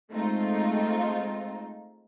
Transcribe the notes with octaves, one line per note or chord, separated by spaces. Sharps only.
G#3 A3 C4 D#4 F4